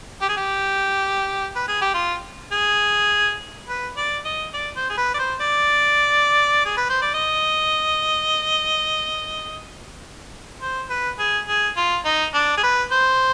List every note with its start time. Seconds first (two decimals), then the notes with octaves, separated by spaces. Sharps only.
0.21 G4
0.29 G#4
0.37 G4
1.55 B4
1.68 G#4
1.81 G4
1.94 F4
2.52 G#4
3.68 B4
3.97 D5
4.25 D#5
4.54 D5
4.76 C5
4.90 G#4
4.97 B4
5.14 D5
5.19 C5
5.41 D5
6.65 G#4
6.77 B4
6.89 C5
7.02 D5
7.14 D#5
10.61 C5
10.90 B4
11.19 G#4
11.48 G#4
11.77 F4
12.05 D#4
12.34 D4
12.57 G#4
12.63 B4
12.92 C5